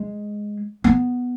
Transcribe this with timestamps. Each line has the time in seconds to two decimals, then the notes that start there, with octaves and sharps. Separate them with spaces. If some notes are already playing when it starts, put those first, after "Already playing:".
Already playing: G#3
0.84 B3